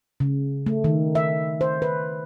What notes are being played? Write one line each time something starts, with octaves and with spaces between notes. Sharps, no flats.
C#3
A3
D#3
E5
C5
B4